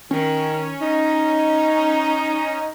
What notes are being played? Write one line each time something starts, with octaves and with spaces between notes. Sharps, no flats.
D#3 C#4
D#4